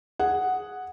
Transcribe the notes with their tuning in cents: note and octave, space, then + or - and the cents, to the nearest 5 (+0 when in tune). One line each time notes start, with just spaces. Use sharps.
G#4 +0 F#5 +0